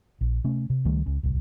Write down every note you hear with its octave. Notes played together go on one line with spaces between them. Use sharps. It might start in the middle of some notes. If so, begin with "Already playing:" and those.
A#1
C3 A3 C#4
C3
C#2 D#3 G3 A3
C#2 C#3
D1 C2